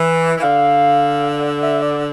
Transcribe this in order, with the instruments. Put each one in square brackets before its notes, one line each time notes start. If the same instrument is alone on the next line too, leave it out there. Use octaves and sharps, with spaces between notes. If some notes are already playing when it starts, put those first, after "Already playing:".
Already playing: [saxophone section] E3
E3
[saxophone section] D3 [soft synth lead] F5
[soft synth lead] E5
D5